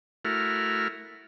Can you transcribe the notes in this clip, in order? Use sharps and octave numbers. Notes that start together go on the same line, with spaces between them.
A3 E4 F#4 A#4 F6